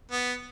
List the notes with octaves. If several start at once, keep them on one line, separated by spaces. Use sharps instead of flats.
B3